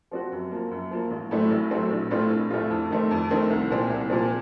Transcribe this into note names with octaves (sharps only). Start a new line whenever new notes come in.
F3 C4 F#4
F#2
F3 A#3
F#2
F3 A#3
A1
A2 F#3 A3 C4
A1
A2 F#3 A3 C4
A#1
A2 A3 C4 F4
A#1
A2 A3 C4 F4
F2
D#3 A3 C4
F2
D#3 A3 C4
C2
A#2 F3 C4
C2
A#2 F3 C4